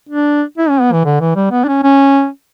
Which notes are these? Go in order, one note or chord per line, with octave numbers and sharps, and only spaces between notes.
D4
E4
C#4
B3
E3
D3
E3
G3
B3
D4
C#4
C#4